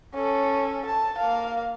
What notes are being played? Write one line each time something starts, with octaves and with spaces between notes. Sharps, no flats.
C#4 A4
A5
A#3 F5